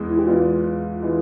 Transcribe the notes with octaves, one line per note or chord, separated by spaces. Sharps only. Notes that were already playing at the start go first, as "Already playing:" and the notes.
Already playing: E2 E3 G#3
E4
G4
E2 E3 G#3 F4
E3 G#3